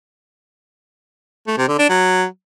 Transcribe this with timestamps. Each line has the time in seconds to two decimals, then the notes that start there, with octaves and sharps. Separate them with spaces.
1.47 A3
1.58 C3
1.68 D3
1.79 D4
1.89 F#3